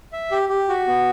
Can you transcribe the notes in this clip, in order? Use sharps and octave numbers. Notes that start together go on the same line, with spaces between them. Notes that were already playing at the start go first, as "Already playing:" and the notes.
E5
G4
G4
F#4
B3